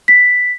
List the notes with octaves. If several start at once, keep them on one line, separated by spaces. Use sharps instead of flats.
B6